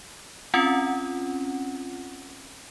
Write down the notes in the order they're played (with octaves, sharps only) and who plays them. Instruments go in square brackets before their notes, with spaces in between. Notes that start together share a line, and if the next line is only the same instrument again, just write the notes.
[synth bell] C4 C#4 F4 F#5